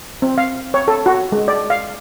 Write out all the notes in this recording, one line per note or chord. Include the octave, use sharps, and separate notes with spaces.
C4
F5
C#5
A4
F#4
G#3
D5
F5